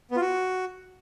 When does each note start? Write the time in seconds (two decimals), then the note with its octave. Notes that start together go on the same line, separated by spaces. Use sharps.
0.11 B3
0.16 F4
0.21 F#4